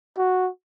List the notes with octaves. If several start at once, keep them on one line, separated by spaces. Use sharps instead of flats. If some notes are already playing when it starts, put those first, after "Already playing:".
F#4